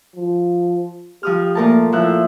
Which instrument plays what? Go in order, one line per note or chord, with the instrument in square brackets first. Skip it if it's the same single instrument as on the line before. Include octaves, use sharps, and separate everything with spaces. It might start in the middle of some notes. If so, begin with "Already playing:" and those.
[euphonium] F3
[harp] F3 D#6 F6 [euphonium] G4
[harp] A#2 A#4 A5 [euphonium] A3
[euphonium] A2 [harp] F3 E5 F#6